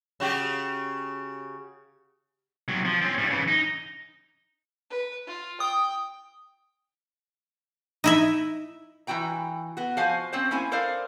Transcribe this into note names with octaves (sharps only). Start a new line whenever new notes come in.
C#3 F#4 G4
C3 F#3
F3
C4 C#4
A2 G3
C#3 E3
D#4
B4
F4
G5 D#6
D#4 E4 E5
E3 C#4 F#4 G5 A#5
B3 F#4
F3 F#4 C5 F5 G#5
C4 C#4 F#4 C5
A#3 C#4 E4 G#5
A4 A#4 C5 D5 F5